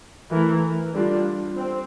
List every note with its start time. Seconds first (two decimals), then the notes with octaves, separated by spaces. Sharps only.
0.32 E3 A3 E4 A#4
0.95 D3 G3 D4 F4
1.55 C4